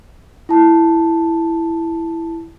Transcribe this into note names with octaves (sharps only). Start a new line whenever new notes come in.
E4 A5